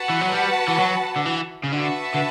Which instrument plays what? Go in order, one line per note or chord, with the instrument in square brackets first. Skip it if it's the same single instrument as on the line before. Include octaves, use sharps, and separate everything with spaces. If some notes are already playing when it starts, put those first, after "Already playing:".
Already playing: [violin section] F#4 B4 F#5 A5
[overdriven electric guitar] E3
F#3
G3
E3
F#3
D3
E3
C#3
[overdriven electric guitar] D3 [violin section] F#4 B4 E5 A5
[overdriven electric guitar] D3